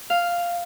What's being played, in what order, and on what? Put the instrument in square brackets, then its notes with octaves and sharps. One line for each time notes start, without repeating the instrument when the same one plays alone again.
[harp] F5